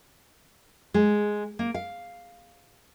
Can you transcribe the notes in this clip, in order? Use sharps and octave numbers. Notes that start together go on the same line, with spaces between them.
G#3
A#3
F5